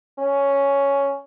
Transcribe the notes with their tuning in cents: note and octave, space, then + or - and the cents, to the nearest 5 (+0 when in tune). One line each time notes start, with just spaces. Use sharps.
C#4 +5